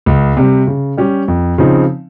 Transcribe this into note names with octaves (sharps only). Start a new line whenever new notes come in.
C#2
C3 G3
C#3
G3 C#4 G4
F2
C#3 F3 C4 D#4